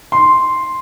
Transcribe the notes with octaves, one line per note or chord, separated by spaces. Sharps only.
C6